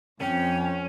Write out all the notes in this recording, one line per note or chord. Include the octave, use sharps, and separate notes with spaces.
F2 C#4 G5